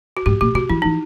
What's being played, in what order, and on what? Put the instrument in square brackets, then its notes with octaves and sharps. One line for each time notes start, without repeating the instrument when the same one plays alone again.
[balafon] F#4
[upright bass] G#2 [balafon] G4
[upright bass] A#2 [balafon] G4
[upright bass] C3 [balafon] F#4
[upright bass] E3 [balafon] E4
[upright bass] E3 [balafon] D#4